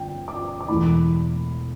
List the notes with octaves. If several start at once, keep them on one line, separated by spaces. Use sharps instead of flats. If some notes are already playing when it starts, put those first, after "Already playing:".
Already playing: G1 G5
D6
D6
E1 E2 E3 A3 E4 B5